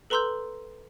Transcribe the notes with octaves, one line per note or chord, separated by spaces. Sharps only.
A4 B4 A#5 C6 E6 G6